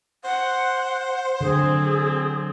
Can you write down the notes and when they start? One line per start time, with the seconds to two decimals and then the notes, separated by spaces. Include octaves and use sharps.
0.24 C5 F#5
1.41 D3 F#3 C4 G#4